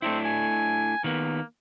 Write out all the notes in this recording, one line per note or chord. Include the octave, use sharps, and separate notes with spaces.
A3 C4 D4 E4
G#5
D#3 A#3 B3